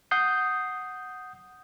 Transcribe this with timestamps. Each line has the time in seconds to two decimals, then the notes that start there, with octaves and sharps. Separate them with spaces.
0.11 F#5 D#6 G6 C7